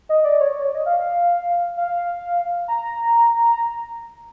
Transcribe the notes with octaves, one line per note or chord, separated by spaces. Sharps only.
D#5
D5
C#5
C#5
D5
D#5
F5
F5
A#5